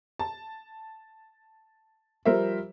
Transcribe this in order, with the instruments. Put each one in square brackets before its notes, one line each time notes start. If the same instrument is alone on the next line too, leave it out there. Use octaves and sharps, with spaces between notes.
[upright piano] A5
F3 G3 A#4 C5 E5